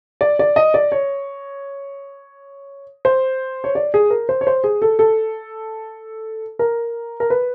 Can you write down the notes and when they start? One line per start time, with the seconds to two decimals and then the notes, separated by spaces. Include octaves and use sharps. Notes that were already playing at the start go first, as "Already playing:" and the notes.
0.21 D5
0.39 D5
0.56 D#5
0.74 D5
0.92 C#5
3.05 C5
3.64 C#5
3.75 D5
3.94 G#4
4.10 A#4
4.29 C5
4.41 C#5
4.47 C5
4.64 G#4
4.82 A4
4.99 A4
6.59 A#4
7.20 A#4
7.30 B4